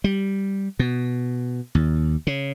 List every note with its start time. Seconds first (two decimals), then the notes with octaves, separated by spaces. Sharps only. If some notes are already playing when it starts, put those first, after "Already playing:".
0.04 G3
0.79 B2
1.75 D#2
2.27 C#3